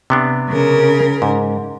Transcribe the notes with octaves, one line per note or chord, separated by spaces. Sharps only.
C3 B3 D4
C#3 A#4
G#2